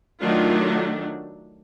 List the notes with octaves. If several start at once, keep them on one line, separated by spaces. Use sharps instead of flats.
D#3 F#3 A3 D4 F4